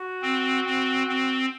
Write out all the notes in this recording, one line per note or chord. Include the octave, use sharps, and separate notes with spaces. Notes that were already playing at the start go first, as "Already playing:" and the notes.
Already playing: F#4
C4
C4
C4